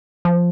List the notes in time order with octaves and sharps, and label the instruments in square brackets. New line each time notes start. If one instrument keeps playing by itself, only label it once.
[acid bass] F3